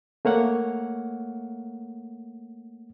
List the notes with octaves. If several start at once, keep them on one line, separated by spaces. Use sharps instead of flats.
A3 A#3 C#5 F#5